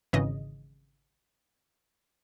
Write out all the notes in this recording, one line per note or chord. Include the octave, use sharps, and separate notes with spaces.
G#1 C#3 E3 D#5